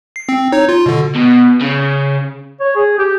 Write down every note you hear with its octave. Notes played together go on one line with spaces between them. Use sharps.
C7
C4
D#4 C#5
F4
B2 D3
B2
C#3
C#5
G#4
G4